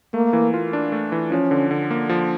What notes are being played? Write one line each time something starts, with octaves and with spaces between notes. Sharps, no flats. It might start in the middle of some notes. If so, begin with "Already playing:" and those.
A3 A#3
E3
F4
D4
A3
E3
F3 C#4
D3
D3
A#3
F3